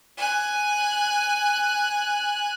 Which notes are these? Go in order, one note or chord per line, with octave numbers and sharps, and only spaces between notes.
G#5 F#6